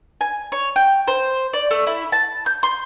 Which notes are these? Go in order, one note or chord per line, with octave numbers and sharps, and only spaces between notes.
G#5
C#5
G5
C5
D5
A3
E4
A5
G6
C6